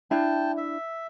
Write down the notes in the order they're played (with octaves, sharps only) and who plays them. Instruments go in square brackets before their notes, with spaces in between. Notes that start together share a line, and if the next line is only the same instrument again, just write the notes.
[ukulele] D4 E4 [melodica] G5 A5
[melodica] E5